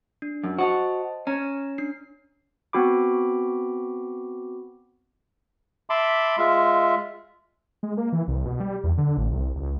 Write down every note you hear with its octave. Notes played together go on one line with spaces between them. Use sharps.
D4
F#2
F#4 C5 D#5 A5
C#4 A#5
D4 C7
B3 C4 F#4 B5 D6
E5 A5 B5 C6 D6
G#3 F4 E5
G#3
A#3
E3
C2
B2
G3
E2
D3
A1
C2
C#2